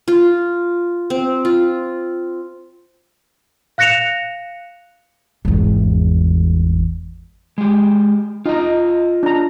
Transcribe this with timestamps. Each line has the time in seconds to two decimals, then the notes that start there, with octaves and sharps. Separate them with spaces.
0.08 F4
1.10 C4
1.45 F4
3.78 F5 F#6 A#6 C#7 E7 F7
5.45 G#1 E2
7.58 G#3 G4
8.46 D#4 F4 D#5
9.23 D4 A#5